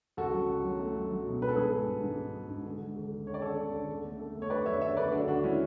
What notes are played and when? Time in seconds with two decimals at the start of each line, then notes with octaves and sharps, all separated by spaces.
0.17 C#2 F#4 A4
0.34 F#3
0.49 C#2
0.64 F#3
0.79 A3
0.96 F#3
1.11 F#3
1.26 B2
1.41 G#2 B4
1.48 A4
1.55 G#2 G#4 B4
1.72 G#3
1.87 G#2
2.03 G#2
2.18 G#3
2.34 G#3
2.50 G#2
2.65 D3
2.81 G#3
2.96 D2
3.12 D3
3.27 D3 C#5
3.34 D5
3.42 D3 A4 C#5
3.58 D3
3.73 D2
3.89 D3
4.04 A3
4.19 A3
4.35 A3
4.42 C#5
4.50 A3 B4 D5
4.66 F#2 C#5 E5
4.81 D3 C#5 E5
4.97 A3 B4 D5
5.12 D2 D4 F#4
5.28 D3 D4 F#4
5.43 G#3 C#4 E4